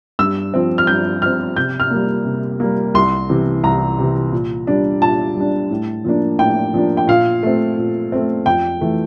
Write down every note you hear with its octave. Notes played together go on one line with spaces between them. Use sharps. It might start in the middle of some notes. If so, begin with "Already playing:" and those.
G2 E6
F3 C4
F6
G2 G6
F3 C4 F6
C3 G6
F6
G3 A#3
C3
G3 A#3
C2 C6
C3 E3
C2 A#5
C3 E3
A#2
G3 D4
A#2 A5
G3 D4
A2
F3 A#3 D4
A2 G5
F3 A#3 D4
G5
A#2 F5
A3 C4
A#2
A3 C4
F2 G5
E3 A3